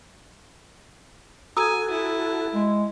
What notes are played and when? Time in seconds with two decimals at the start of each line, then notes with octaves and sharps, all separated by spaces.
1.57 F#4 A4 G#5 A#5 D#6 E6
1.91 E4
2.54 G#3